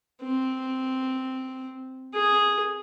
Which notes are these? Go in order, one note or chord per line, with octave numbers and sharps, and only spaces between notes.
C4
G#4